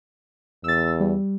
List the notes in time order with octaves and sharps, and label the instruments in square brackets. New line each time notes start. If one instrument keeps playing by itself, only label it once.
[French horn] E2 [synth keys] E6 A6
[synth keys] G3